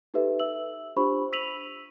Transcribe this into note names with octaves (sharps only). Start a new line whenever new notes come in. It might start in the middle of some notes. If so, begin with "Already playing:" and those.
D#4 G4 A4 B4 E5
E5 E6 F#7
D4 F4 G4 C5 B5 C#6
E6 B6 D#7 F7 F#7